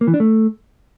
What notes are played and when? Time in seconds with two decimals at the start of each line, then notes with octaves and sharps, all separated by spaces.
0.01 A#3
0.07 E3
0.14 D4
0.20 A3